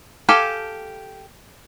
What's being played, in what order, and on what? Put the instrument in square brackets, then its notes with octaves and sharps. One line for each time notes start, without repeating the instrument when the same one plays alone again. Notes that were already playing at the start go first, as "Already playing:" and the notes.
[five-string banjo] G4 A4 F5 G#5